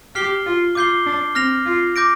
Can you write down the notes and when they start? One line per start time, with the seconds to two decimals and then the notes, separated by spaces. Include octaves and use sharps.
0.15 G4 F6 C7 G7
0.46 F4
0.75 F4 D6 G6 C7 G7
1.06 D4
1.35 C4 F6 A#6 F7
1.66 F4
1.96 D6 G6 A#6 D7